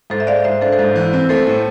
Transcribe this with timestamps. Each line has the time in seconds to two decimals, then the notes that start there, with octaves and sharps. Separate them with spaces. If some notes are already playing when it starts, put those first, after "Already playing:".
0.10 G#2 A4 C5
0.20 E5
0.27 G#3 D5 F5
0.44 G#2 C5 E5
0.61 D4 A4 C5
0.72 A4 C5
0.79 G#2
0.96 E3
1.13 C4
1.29 A3 A4 C5
1.47 A2